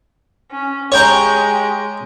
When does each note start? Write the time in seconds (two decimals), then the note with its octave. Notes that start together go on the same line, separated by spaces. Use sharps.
0.51 C#4
0.92 G#3 G4 C#5 G5 A#5